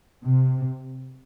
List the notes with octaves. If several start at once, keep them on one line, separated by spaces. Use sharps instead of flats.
C3